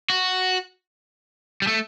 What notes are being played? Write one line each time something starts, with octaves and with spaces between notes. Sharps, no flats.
F#4
G3
A3